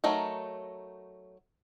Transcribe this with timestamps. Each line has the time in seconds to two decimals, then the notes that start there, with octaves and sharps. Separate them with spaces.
0.04 F#3 A3 D#4 A#4